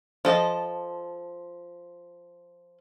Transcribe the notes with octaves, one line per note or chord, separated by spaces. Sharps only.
F3 A4 D#5